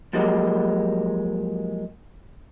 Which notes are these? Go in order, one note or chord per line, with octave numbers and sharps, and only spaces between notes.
F3 F#3 G#3 A#3 G4